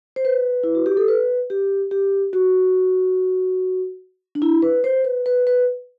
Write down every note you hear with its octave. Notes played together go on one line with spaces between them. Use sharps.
C5
B4
E4
F#4
G4
A4
B4
G4
G4
F#4
D4
E4
B4
C5
B4
B4
B4